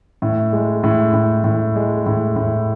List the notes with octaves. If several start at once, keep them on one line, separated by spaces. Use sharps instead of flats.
A2
G#3
A2
A2
A2
G#3
A2
A2